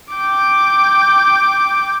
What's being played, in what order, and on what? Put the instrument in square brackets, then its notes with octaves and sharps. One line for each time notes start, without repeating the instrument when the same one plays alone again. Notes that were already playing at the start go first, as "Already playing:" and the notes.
[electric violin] G5 D6